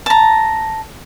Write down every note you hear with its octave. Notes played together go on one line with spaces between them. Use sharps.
A5 A#5